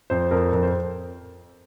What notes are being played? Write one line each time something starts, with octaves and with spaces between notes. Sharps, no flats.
F2 C5
F2 A#4
F2 A#4
C5